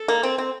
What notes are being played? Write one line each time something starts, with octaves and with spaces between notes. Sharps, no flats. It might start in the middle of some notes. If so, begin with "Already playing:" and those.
Already playing: A4
A#3
C4
C4